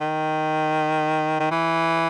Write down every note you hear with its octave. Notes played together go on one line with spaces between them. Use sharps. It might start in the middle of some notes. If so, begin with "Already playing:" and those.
D#3
D#3
E3